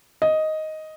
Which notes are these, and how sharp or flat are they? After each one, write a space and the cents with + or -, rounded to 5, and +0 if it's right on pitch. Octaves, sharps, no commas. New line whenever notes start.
D#5 +5